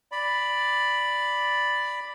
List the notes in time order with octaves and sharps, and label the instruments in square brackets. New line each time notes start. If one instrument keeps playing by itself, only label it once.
[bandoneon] D5 B5